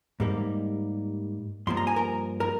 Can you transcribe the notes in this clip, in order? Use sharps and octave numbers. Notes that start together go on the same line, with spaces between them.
G#2 G3 A#3
G2 F3 A#3 C6
A#5
G#5
A#4 A#5
A#4 A#5